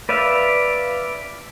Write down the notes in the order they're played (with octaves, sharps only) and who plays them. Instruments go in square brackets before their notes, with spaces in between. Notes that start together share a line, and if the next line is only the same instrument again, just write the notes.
[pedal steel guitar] B4 D5 E5 F5